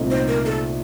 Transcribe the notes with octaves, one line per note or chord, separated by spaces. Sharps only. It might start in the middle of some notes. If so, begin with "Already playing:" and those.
Already playing: C2 A#2 A3 C4 D#4
C5
A#4
A4